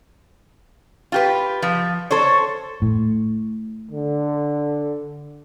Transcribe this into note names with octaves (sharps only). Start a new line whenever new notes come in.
F4 G4 B4
F3
A4 C5 C#5
A2
D3